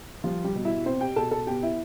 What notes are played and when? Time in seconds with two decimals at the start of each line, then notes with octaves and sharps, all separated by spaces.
0.24 F3 G3 F4
0.44 G3 G4
0.55 B2
0.65 E4 E5
0.85 C4 C5
1.01 G4 G5
1.16 B2 A4 A5
1.31 A4 A5
1.47 B3 G4 G5
1.63 E4 E5